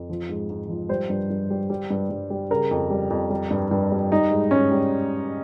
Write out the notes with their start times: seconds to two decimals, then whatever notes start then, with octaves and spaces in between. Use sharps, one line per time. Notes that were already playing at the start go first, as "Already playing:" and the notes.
Already playing: F2
0.10 F3
0.29 G#2
0.50 G#2
0.69 F3
0.89 G3 C5
1.10 G2
1.30 G2
1.50 G3
1.70 G3
1.90 G2
2.10 G2
2.30 G3
2.50 C#3 A#4
2.71 F2
2.90 G3
3.10 F2
3.30 G3
3.51 G2
3.71 G2
3.92 G3
4.11 G3 D#4
4.31 G#2
4.51 G#2 C#4
4.71 G3